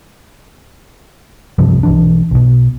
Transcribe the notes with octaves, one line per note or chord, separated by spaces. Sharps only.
C2 G2 C3 F3
B1 E3 D4
B1 B2